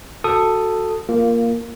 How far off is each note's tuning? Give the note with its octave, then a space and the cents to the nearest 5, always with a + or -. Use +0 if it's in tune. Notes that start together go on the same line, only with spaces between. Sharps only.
F#4 +0 A4 +10 D#6 +0
A#3 +0 F4 -10